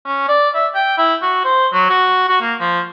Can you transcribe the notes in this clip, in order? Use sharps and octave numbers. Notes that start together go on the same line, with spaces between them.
C#4
D5
E5
G5
E4
F#4
C5
F#3
F#4
F#4
A#3
F3